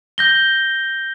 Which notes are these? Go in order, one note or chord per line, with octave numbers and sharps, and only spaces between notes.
G6 A#6 G7